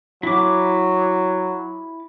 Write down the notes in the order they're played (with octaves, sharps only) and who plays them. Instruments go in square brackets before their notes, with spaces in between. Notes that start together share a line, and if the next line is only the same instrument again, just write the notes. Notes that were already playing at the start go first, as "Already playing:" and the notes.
[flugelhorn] F#3 [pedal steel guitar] E4 D6